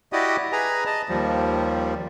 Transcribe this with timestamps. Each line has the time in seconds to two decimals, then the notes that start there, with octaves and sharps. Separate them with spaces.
0.13 E4 F#4 G4 D5 D#5 D#6
0.52 G#4 B4 G#5 A#5
0.86 D#5 A5
1.09 D#2 F3 G3